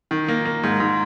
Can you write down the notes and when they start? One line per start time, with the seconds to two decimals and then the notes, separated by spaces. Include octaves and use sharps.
0.11 D#3
0.28 A#3
0.45 A#3
0.63 G#2
0.80 G#2